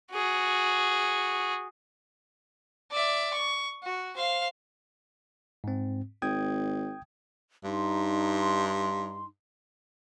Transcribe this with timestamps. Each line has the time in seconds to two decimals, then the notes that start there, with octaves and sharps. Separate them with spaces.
0.12 F#4 G#4
2.92 D5 E5
3.34 C#6
3.83 F#4
4.17 C5 F5
5.64 G#2 C4
6.22 G#1 G5 D#6 G#6
7.64 G2 D#4 C6